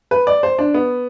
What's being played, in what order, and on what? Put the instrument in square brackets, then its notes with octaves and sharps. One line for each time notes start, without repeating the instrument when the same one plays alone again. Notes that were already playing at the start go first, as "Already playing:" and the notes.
[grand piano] B4
D5
C5
D4
B3